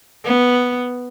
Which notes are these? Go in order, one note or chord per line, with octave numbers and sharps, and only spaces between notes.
B3